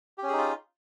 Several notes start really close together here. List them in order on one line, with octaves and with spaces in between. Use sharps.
G4 C#4 G#4 D#4 F4